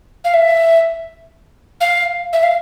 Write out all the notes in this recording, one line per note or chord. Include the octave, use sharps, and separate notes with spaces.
F5
E5
F5
E5
F5